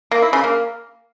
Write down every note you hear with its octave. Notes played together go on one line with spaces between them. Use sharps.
A#3
E4
C#3
A#3